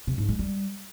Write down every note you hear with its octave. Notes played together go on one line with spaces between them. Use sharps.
C3
G#2
G#3
G3